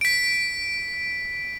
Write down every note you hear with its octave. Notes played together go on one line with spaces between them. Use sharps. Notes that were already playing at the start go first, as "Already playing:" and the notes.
B6 D7